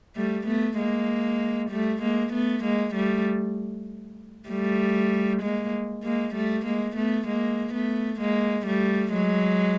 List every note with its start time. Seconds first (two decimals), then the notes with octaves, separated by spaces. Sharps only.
0.16 G3 A3
0.47 A3 B3
0.78 G#3 A#3
1.70 G3 A3
2.02 G#3 A#3
2.33 A3 B3
2.64 G#3 A#3
2.95 G3 A3
4.49 G3 A3
5.42 G#3 A#3
6.03 G#3 A#3
6.35 G3 A3
6.65 G#3 A#3
6.96 A3 B3
7.27 G#3 A#3
7.74 A3 B3
8.20 G#3 A#3
8.66 G3 A3
9.13 F#3 G#3